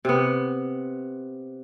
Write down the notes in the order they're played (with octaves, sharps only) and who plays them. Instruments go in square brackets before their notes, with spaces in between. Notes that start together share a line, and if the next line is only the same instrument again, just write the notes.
[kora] C3 B3